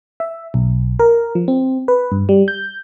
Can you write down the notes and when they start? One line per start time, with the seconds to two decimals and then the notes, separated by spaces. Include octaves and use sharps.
0.20 E5
0.54 B1
0.99 A#4
1.35 F3
1.48 C4
1.88 B4
2.12 G2
2.29 G3
2.48 G6